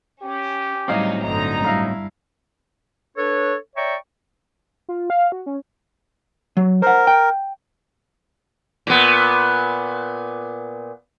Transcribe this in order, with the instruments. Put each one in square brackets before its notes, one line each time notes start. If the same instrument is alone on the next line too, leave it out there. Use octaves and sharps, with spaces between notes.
[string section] C#4 [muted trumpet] G4
[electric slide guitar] A2 F#3 C4 [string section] G3 D#4 [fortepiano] D#5 F5 D6
[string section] G1 D3 A#5 [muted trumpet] D#4
[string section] G2 [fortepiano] E4 F5 A#5
[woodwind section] D4 A4 B4 C#5
C#5 D5 E5 G5 A#5 C#6
[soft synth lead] F4
F5
F#4
C#4
[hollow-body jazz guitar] F#3
[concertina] A#4 [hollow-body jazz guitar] C5 F#5
[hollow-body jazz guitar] G5
[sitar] A#2 B3